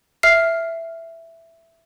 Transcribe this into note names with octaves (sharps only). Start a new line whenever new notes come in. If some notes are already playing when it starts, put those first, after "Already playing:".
E5 F6 C7